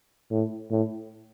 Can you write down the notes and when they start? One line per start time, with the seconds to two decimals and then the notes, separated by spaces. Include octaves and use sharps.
0.31 A2
0.71 A2